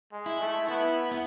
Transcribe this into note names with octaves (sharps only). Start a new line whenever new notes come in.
G#3
E4
A3
B3 E4
B3